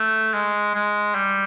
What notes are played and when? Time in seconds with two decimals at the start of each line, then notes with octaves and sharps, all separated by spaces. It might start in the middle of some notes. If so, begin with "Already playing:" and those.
Already playing: A3
0.34 G#3
0.75 G#3
1.15 G3